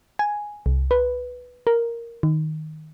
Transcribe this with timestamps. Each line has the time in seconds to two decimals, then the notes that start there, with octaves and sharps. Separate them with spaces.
0.19 G#5
0.66 C2
0.91 B4
1.67 A#4
2.23 D#3